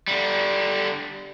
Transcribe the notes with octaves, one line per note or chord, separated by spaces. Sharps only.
D3 G3